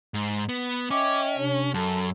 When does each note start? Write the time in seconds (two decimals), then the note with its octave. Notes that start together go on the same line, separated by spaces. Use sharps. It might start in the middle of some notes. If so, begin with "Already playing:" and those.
0.14 G#2
0.49 B3
0.91 C#4 D#5 E5 G5 D6
1.38 C3 D4 C#5
1.74 F#2 A4 A5